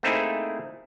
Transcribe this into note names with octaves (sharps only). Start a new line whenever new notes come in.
A3 A#3 C4 D#4 E4 G#4